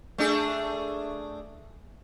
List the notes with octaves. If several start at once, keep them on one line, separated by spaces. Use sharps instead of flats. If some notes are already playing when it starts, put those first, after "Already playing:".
A3 D4 G#4